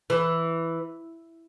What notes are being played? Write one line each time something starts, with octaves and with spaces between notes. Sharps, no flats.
E3